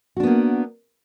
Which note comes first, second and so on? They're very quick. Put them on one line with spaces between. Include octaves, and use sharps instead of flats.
F#4 D4 B3 A#3